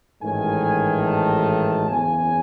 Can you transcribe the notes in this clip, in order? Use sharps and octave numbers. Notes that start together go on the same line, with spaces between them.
A1 G#2 D#3 A3 G#5
A5
F#1 E2 C#3 G#5